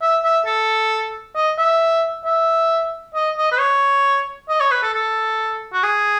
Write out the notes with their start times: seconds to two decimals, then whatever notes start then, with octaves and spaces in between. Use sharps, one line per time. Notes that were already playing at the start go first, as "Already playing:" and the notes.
0.01 E5
0.24 E5
0.46 A4
1.35 D#5
1.58 E5
2.25 E5
3.15 D#5
3.37 D#5
3.52 B4
3.59 C#5
4.49 D#5
4.60 C#5
4.71 B4
4.83 A4
4.94 A4
5.73 F#4
5.83 G#4